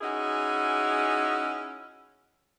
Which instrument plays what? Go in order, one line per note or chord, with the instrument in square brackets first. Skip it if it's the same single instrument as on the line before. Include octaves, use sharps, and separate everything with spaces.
[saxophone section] C#4 D#4 E4 F#4 G#4